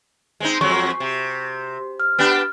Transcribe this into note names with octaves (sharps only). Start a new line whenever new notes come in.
G#3 C4 D#4
F2 F#3 G#3 C#6
C3
F6
B3 D4 G4